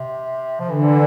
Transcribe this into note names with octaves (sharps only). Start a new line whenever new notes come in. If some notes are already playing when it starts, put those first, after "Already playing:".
Already playing: C3
F3
D3 E3